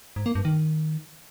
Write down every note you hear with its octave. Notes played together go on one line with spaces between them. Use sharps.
G#2
A#3
G2
D#3